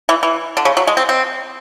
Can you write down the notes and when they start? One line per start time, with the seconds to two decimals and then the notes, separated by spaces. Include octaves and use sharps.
0.09 E3
0.23 E3
0.57 D3
0.65 C#3
0.77 F#3
0.87 G#3
0.97 C4
1.09 C4